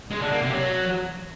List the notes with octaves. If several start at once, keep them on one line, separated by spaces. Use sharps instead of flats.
G#3
D3
A#3
C3
F#3